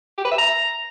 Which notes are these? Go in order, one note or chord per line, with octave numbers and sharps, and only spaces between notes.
G4
B4
E5
A#5